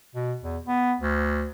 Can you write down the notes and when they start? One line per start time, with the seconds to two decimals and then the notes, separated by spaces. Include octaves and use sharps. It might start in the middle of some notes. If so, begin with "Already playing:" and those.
0.15 B2
0.42 E2
0.67 B3
1.00 D2